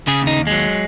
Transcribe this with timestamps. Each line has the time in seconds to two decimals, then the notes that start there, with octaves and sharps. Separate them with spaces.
0.07 C#3 G#4
0.22 D#2
0.27 D#4
0.37 D#2
0.47 F#3 G#3